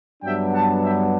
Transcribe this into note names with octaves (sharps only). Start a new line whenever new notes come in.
G2 F#3 B3 D4 E5 G5
F#5 A5
E5 G5